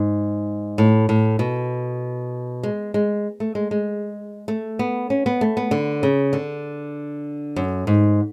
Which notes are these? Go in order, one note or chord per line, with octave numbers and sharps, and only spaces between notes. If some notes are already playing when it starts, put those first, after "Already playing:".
Already playing: G#2
A2
A2
B2
G#3
G#3
A3
G#3
G#3
A3
B3
C#4
B3
A3
B3
D3
C#3
D3
F#2
G#2